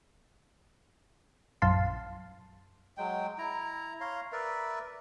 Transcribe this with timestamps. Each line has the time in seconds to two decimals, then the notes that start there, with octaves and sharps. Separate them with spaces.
1.62 A#1 F#2 F5 A5 C6
2.97 F#3 G#3 G5
3.38 E4 A#5
4.01 C#5 F5 A#5 C6
4.32 A#4 B4 D5 E5